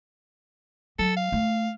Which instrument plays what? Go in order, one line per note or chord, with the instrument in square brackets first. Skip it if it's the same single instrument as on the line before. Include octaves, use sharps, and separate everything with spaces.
[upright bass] F#3 [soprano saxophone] A4
[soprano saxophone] F5
[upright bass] A3